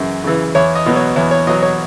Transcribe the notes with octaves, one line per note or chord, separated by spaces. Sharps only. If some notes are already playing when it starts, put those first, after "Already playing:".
Already playing: F#2 C#3 E3
C#3 E3
E2 C#5
D#5
B2 F#3
C#5
E2 C#5
C#5
B2 F#3 D#5
C#5